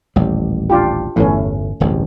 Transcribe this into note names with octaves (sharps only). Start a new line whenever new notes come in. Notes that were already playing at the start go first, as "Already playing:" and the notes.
D#1 A1 G3
D4 F4 G4
G1 E2 A2 E3 A3 C#4
D1 A1 G2